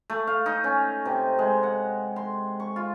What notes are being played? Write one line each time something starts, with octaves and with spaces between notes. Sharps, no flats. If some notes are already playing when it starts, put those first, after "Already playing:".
A3
F5
D#4
C#4
C3
G#3
F#5
C6
C#6
F4